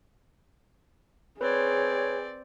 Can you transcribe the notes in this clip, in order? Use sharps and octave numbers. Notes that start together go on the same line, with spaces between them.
C4 G#4 B4 C#5 D5